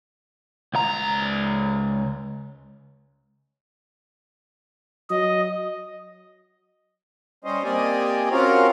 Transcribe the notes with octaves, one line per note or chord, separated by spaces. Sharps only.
C#2 A#5
F#3 D#5
G3 C#4 C5 D#5
A#3 C4 G4 D5 D#5 G#5
C4 C#4 F4 F#4 A#4 F5